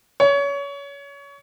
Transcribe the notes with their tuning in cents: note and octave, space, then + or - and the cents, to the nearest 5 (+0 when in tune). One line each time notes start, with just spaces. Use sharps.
C#5 +25